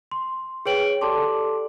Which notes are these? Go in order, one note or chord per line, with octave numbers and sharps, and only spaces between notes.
C6
G#4 B4 C#5 G5 D7 F#7
G4 A4 D5 A5 C6 D6